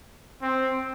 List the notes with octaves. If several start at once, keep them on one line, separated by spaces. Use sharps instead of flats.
C4